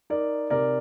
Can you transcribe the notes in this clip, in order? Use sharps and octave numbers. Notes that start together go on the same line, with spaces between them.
D#4 A#4 D5
C3 A#4 D5